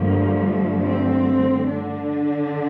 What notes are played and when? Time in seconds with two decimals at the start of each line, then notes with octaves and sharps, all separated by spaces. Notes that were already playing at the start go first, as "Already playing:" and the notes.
Already playing: G2 D3 F3 A3 A#3
0.84 C4
1.68 D3 D4